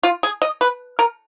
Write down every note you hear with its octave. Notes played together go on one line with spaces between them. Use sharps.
F4
G#4
D#5
B4
A#4